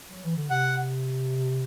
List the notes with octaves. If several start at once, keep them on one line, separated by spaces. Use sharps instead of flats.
F#3
E3
D3
C3 F#5